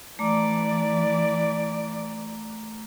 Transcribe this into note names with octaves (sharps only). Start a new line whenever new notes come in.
E3 A3 D5 A#5 D6